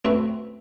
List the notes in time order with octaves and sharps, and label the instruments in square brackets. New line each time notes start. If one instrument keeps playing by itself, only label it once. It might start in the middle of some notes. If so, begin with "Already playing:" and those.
[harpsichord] A3 C4 F#4 B4